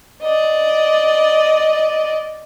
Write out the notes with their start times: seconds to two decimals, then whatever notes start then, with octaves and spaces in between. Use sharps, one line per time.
0.22 D5 D#5